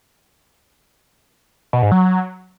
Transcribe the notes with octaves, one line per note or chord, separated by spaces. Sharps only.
B2
G#2
F#3